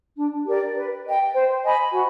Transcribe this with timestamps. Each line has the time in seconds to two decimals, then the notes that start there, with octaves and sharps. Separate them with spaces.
0.17 D4
0.46 G4 A#4 D5
0.75 B4
1.05 D#5 G5
1.34 C5
1.63 D#5 G#5 B5
1.92 F#4